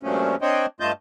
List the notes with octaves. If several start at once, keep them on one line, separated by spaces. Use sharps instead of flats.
G2 A#2 F3 F#3 A3 C#4
C4 D4 C5 C#5 D#5 G5
G2 A3 F4 D#5 A5 G6